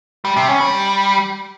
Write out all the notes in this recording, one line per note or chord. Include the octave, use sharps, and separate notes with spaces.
G3
C3
C#4
G3